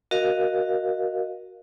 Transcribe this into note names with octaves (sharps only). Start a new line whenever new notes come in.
F#4 A#4 D#5 F5